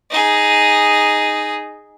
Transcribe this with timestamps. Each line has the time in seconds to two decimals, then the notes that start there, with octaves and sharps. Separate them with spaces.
0.11 D#4 G#4